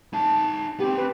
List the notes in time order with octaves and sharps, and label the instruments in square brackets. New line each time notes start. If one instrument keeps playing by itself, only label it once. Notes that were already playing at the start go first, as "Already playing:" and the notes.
[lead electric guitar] D#4 A5
[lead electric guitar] B3 C4 [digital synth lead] G4
[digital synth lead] B4